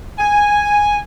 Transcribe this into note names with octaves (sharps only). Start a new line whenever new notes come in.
G#5